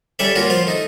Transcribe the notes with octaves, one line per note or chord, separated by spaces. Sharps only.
G3 C#4 A4 D5 E5
A#3 C#4 F4 F#4
F3 F4 F5
A3 D#4